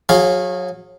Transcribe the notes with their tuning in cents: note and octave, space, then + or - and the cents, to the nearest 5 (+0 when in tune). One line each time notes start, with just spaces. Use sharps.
F#3 -30 G#4 +0 F5 +0